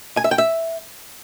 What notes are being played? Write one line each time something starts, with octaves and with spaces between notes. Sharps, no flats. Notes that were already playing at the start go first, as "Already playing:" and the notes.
G#5
E5
G5
E5